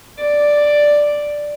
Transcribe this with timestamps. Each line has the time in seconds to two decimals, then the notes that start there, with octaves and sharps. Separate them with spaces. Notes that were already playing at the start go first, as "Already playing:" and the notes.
0.19 D5